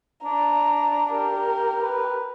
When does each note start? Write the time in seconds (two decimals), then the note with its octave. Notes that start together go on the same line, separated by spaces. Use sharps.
0.25 D4 A#5
1.12 G4 A#4
1.82 B4